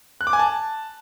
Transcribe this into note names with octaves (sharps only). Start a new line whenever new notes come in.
F#6
D6
G#5
A5